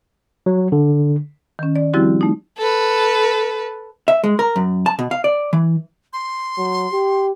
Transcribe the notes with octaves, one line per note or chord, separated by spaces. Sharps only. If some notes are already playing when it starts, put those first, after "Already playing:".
F#3
D3
D#3 C#4
D5
F3 G3 C4 E4 F#4 G4
A3 D#4
A4 B4
E5
G#3
A#4
F#2
A5
B2
F5
D5
E3
C6
F#3
G4